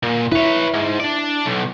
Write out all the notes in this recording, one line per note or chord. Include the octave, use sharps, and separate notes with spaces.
A#2
E4 B4 C#5
G#2
D4 D5
B1